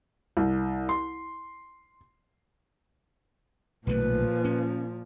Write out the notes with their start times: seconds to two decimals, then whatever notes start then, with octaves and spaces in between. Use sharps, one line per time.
0.37 C2
0.89 C6
3.87 B1 A#2 D#3 F3 A3 B4
4.45 C#4